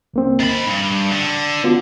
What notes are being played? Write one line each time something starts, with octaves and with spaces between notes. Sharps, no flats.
C#2 A#3 C4
D#3 B5 A6
G2
D3
B3 F4 F#4